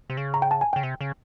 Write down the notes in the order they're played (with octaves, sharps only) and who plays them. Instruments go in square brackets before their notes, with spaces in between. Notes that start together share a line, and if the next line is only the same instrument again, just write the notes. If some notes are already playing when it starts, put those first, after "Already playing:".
[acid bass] C3
C#3
[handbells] A#5
G5
A5
G#5
[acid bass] C#3 [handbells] G5
[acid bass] C3
C#3